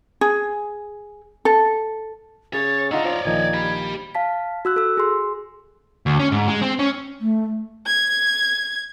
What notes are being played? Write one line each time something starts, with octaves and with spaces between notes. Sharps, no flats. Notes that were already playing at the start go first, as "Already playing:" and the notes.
G#4
A4
C#3 C#5 A6
D4 D#4 F4 E5 F#5 A#5
F3 C#5 D5
A#1 D#3 F3 D#4 G#6
G4 B5
F5 A5 B6
F#4 E6 F#6
A4 E6
G#4 C6
D2
C#4
G#2
G#3
C4
C#4
A3
G#6